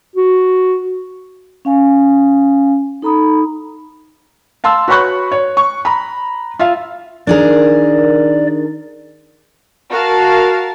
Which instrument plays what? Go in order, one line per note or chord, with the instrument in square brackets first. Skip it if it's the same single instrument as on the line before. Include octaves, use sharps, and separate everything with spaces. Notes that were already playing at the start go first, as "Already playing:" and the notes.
[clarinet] F#4
[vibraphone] C#4 F5 G#5
D#4 A4 A#5 B5 D#6
[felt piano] F5 A5 C6 E6
F#4 B4 C#5 B5 C#6 F#6
C#5
C#6
A#5 B5
F4 E5 F5
[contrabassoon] D#3 [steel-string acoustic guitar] D4 G#4 A#4 [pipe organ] D5
[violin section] F#4 A#4 F5 A5